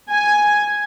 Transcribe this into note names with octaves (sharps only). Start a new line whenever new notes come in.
G#5